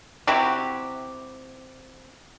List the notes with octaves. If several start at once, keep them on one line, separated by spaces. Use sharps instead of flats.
C3 E4 F#4 G4